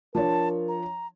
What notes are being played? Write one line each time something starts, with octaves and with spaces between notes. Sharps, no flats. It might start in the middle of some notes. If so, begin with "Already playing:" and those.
F3 D4 A#4 C#5 A5
A#5